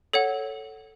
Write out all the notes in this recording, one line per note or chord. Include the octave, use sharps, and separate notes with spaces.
A4 C#5 F#5